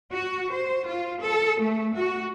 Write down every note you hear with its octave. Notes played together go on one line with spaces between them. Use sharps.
F#4
C5
F4
A4
A3
F#4